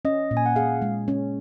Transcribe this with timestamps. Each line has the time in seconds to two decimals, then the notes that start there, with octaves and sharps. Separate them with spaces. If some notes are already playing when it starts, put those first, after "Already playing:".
0.05 C#4 D#5
0.31 A#2
0.37 G#5
0.46 F#5
0.56 G#4 F5
0.82 G#3
1.08 C#4